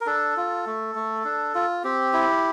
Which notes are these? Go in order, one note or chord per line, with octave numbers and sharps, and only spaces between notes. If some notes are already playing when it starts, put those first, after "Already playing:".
A#4
D4 A4
F4
A3
A3
D4
F4
C4 G4
E4